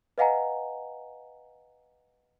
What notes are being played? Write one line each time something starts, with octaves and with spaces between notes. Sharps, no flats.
B4 D#5 F5 F#5 G#5 A#5